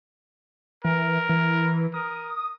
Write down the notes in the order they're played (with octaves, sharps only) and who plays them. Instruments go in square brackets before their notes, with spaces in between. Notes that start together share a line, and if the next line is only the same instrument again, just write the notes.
[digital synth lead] E3 [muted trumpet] A#4
[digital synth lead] E3
[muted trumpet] A#4 [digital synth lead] D#6